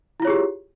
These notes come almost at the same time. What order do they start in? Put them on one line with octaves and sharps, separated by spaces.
E4 F4 C#5 G#4 G4